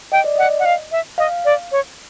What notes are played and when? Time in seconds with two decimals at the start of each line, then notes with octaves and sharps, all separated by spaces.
0.12 D#5 G5
0.24 D5
0.36 D#5 F#5
0.59 F#5
0.65 F5
0.92 E5
1.18 D#5 F5
1.45 D5
1.72 C#5